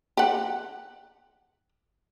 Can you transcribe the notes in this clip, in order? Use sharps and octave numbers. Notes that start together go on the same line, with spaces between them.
G4 F#5